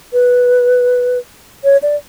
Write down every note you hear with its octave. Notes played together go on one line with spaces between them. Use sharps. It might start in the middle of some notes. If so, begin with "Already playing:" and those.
B4
C#5
D5